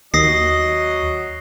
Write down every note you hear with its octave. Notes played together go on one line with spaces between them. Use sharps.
D#2 F#3 D#5 D#6 A#6 C7